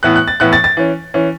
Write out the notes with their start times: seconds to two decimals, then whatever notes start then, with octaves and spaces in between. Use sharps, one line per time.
0.03 A2 E3 B3 F#6
0.16 F#6
0.28 A6
0.40 A2 E3 B3 F#6
0.53 A6
0.64 A6
0.77 E3 C#4
1.14 E3 C#4